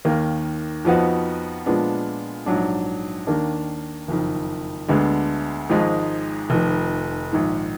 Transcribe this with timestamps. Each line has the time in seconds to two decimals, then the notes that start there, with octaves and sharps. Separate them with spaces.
0.05 D#2 D#3 A#3
0.85 F2 F3 B3 D#4 F#4
1.66 A#2 F3 G#3 B3 D4
2.46 A#1 G#2 F#3 D4
3.27 D#2 D#3 A#3 D4
4.08 F#1 F2 D#3
4.88 D2 D3 G#3 B3 D4
5.69 G#1 G#2 F3 G#3 D#4
6.50 F1 F2 D#3
7.32 A#1 G#2 D#3